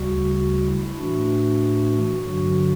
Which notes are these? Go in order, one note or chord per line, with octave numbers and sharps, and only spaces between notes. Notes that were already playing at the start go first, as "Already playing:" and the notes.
Already playing: D2 C#3 G3 F#4
F#4
E4
A2 E3 A3 D4 F#4
G2 D3 F#3 F#4